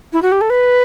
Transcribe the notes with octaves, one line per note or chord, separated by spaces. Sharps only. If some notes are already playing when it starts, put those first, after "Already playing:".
E4
F#4
G4
A4
B4